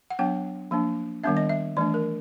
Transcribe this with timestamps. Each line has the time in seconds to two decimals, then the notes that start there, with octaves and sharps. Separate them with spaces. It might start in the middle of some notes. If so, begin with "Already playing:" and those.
0.10 F#5
0.19 F#3 B3 D4 G5
0.71 F3 A#3 D4
1.24 D#3 G3 B3 D4 E5
1.37 D#5
1.49 E5
1.77 E3 A3 D4 D5
1.94 A#4